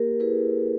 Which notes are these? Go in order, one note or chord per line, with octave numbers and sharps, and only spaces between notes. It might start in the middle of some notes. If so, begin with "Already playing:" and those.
Already playing: A#3 G4 A#4
E4 G#4 B4